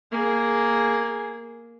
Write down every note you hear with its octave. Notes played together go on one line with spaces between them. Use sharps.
A#3 G#4